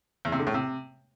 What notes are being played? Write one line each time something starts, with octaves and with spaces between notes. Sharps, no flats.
E2
C3
D3
A2
C3